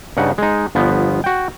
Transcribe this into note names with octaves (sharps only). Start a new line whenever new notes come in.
G2 C#3 D#4 F#5
G#3 D#4
G1 F3 B3
F#4 G5